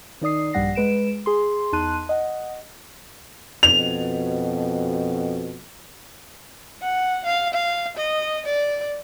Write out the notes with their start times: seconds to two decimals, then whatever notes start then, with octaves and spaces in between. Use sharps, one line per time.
0.21 D#3 D#4 D5 D#6 C7
0.53 A#1 G2 G3 F#5 A#6 C7
0.75 G#3 B4 D7 E7
1.26 G#4 C6
1.73 E2 D#4 A5 C6 F#6 D#7
2.09 D#5 F#5
3.63 F2 B2 F7
6.82 F#5
7.25 F5
7.54 F5
7.97 D#5
8.46 D5